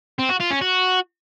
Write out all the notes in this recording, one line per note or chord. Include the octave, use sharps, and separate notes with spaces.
C4
F#4
F4
C#4
F#4